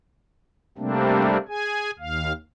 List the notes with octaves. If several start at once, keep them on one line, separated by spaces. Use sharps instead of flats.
C3 G3 A3 A#3 C4 D4
G#4 G#5
D#2 F5